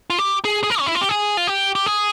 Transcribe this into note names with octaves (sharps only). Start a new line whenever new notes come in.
F4
G4
G#4
G#4
A#4
C#4
E4
F4
G4
G#4
F4
G4
G4
G#4